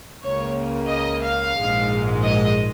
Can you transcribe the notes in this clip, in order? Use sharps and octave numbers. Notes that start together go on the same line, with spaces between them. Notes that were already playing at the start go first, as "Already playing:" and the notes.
C#2 C#3 A#3 C#5
D#5
F5
A#1 G#2 G#3
D#5